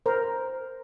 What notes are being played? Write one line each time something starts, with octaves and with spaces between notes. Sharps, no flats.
A#4 C5